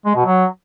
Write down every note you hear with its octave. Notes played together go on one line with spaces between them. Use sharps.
G#3
B2
F#3